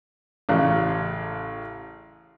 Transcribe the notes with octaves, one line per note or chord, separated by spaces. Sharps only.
A1 C#3